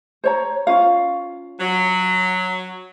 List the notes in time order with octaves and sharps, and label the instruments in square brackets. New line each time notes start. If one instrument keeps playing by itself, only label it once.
[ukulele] C5 C#5 A#5
C#4 F4 F5
[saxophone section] F#3